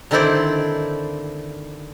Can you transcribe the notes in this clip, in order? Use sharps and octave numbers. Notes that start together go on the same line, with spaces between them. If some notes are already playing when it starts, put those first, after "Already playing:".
D3 D#3 C4 E4 C5 D5